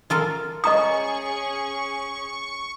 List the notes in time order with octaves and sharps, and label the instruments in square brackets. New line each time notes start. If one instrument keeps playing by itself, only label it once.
[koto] F4 A4 A#4
[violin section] C#4 G#4 [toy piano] D#5 A#5 D#6 [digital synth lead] C#6